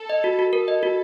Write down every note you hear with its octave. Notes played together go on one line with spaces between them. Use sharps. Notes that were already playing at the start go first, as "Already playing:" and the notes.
Already playing: A4
D#5
F#4
F#4
A4 A#4
D#5
F#4